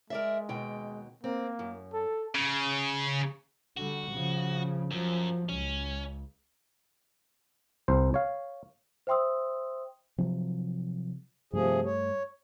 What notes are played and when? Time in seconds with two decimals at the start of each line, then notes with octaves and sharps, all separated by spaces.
0.10 G#3 A#4 D5 E5
0.49 D#2 B2 G5
1.24 A#3 C4
1.59 F#2
1.94 A4
2.35 C#3
3.77 D3 G3 F#4
4.11 C#3 F3
4.91 F#2 F3 F#3
5.49 C#2 C#4
7.88 C2 C5
8.14 C#5 F5
9.07 C5 E5 G5 C6 D#6 E6
10.18 C3 F3 F#3
11.53 G2 C3 F3 G3 A3 G#4
11.85 C#5